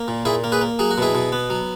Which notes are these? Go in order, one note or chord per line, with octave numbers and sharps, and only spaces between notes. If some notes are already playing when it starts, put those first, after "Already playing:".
Already playing: A#3
A#2
A#2 E4 G#4
A#3
G#4 B4
A#3
F#3 G#4
F#4
B2 E4 G#4
B2
B3
F#3